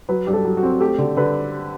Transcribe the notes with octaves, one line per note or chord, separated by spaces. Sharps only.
F#3 B4
G2 G4
A4
F#3
F#4
C4
A3 G4
D3
D3 B4